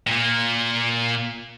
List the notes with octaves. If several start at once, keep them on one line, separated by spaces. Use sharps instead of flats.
A#2 A#3